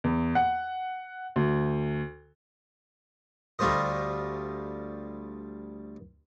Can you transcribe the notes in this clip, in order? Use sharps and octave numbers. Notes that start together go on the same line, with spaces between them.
E2
F#5
D2
D2 G3 A3 F4 C5 D#5